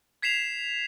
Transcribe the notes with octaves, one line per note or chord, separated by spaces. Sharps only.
G#6 B6 C7 E7 F7